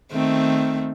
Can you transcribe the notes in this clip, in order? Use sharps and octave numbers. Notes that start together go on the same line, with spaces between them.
D#3 A3 C4